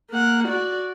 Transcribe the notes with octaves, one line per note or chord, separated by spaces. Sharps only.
A#3 F#5
F#4 D5